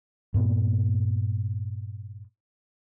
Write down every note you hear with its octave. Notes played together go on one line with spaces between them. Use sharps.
G2 A#2 B3